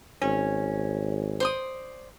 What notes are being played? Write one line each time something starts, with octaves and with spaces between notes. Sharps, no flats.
G#1 C#4
C5 D5 D#6